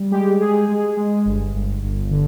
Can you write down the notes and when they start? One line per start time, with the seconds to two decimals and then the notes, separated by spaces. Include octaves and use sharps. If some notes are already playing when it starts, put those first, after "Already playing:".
Already playing: G3
0.11 G#3 G4
0.40 G#3 G#4
0.68 G#3
0.97 G#3
1.25 G1
1.54 G1
1.82 G1
2.11 D3